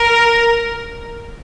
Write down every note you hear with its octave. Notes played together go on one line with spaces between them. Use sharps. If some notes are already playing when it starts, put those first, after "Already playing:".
Already playing: A#4